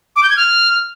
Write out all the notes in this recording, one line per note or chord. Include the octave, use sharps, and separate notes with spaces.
D6
G6
G#6
F6